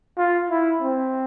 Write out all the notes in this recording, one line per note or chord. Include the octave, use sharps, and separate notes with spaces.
F4
E4
C4